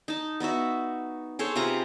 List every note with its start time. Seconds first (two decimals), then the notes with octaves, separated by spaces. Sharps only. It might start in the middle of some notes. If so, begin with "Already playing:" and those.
0.08 D#4 A5
0.40 B3 D#4 F#4 E5
1.39 G#4 A4 C5 C#5
1.56 C3 F4 B4 A#5